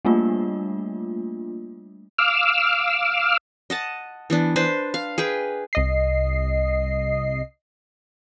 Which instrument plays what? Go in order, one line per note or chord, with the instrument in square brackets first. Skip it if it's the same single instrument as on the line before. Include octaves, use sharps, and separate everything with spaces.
[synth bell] G3 A3 A#3 D4 F4
[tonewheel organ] F5 D6 E6 F6
[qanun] D#5 F#5 A5
E3 B3 D4
D4 B4 C5
F5
G#4 B4 G5
[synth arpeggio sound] C2 D#5 C7